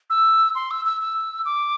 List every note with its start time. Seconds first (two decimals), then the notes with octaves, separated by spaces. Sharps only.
0.10 E6
0.55 C6
0.71 E6
0.85 E6
1.01 E6
1.45 D6